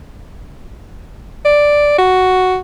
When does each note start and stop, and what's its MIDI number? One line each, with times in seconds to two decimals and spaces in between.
1.45 1.98 74
1.98 2.58 66